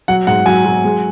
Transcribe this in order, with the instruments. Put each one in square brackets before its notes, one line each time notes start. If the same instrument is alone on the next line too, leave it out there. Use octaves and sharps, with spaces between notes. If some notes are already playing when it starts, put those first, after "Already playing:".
[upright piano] F#3 [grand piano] F#5
[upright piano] G#2 [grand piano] F#5
[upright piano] F#3 [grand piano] G#5
[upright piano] F#3
G#3